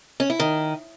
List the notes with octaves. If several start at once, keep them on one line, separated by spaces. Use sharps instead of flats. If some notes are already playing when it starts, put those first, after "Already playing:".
C#4
E4
D#3